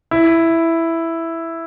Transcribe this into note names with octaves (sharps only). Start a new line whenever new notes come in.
E4